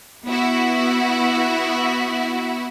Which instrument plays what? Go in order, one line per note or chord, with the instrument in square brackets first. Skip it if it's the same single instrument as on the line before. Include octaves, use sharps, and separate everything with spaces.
[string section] B3 E4 F#4